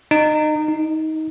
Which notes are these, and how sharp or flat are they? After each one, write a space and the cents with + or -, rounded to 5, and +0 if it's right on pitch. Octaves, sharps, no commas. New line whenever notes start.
D#4 -25
D#4 +20